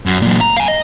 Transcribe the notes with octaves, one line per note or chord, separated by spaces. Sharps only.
F#2
A#2 F#3
A#5
F5 G#5
D#5